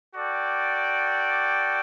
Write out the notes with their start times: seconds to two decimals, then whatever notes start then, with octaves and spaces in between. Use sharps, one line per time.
0.15 F#4 A4 D5 G5